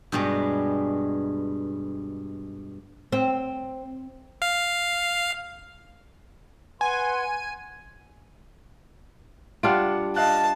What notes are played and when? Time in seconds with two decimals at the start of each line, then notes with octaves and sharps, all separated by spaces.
0.12 G2 B2 G3 G#3
3.12 C4
4.42 F5
6.81 B4 F#5 G#5 C6
9.63 G3 D4 F4 F#5 F6 D7
10.16 D#5 F5 A5 F#6